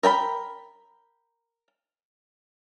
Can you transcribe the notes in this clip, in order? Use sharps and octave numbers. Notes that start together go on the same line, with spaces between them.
A#4 G5 A5 B5